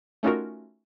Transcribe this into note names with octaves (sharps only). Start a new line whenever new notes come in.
A3 C#4 D#4 F4 F#4 A#4